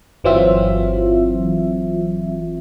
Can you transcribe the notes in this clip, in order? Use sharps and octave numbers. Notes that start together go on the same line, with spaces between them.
G1 E3 F#3 C4 F4 E5